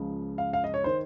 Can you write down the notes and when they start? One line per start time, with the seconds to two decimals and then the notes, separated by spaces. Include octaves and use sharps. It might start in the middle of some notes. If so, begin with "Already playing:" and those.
Already playing: C#2 C#3 F3
0.38 F5
0.53 F5
0.64 D#5
0.74 C#5
0.84 D#3 C5